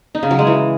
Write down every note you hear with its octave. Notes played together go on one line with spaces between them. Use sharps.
D#4
C#3
F#3
G#3
E3